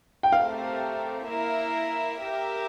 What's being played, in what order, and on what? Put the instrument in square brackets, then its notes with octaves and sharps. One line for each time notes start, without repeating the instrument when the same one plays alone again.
[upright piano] G5
[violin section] A3 C4 G4 A#4 [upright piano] F5
[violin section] A#3 E4 A#4 E5
G4 A#4 E5